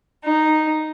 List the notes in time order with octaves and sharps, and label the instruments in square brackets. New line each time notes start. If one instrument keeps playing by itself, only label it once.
[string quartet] D#4